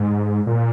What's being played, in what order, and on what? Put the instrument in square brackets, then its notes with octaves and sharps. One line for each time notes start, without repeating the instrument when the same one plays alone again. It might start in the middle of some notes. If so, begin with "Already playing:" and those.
Already playing: [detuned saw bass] G#2
A#2